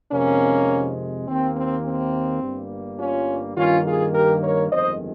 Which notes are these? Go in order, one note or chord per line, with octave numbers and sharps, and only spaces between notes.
F2 C3 D#3 G#3 A#3 C#4
D#2 D#3 A#3 C4
C4
C4
G1 G2 G3 A#3
C#4 F4
G2 D#3 A#3 C#4 F4
F4 G#4
G4 A#4
A#4 C#5
G1 F2 D#3 G#3 C5 D#5